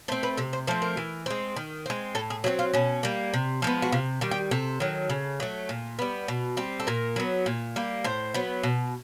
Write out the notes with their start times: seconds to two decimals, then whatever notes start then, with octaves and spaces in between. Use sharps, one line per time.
0.08 A3 C5
0.12 C4
0.23 B4
0.37 C3 A4
0.53 C5
0.67 F3 A3 C4 C5
0.82 A#4
0.97 E3
1.26 G#3 C4
1.56 D#3
1.86 G#3 C4
2.15 A2 A4
2.30 G#4
2.44 F#3 A3 C4 F#4
2.59 F4
2.73 B2 C#4
3.03 G3 A#3
3.34 C3
3.62 F3 G#3 B3
3.82 F#4
3.92 C3 F4
4.21 D#3 G3
4.31 G4
4.51 C3 A4
4.80 D#3 F#3
5.10 C#3
5.40 F#3 A3
5.69 A#2
5.99 G3 B3
6.28 B2
6.57 G3 C4
6.80 A4
6.87 A#2 A#4
7.16 F#3 B3
7.46 A#2
7.76 G3 A#3
8.04 A2 C5
8.34 F#3 B3
8.63 B2